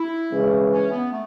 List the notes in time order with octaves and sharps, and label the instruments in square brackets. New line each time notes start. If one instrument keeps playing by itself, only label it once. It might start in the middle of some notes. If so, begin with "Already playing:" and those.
Already playing: [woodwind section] E4
[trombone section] C#3 E3 G#3
[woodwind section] C#4
B3
A3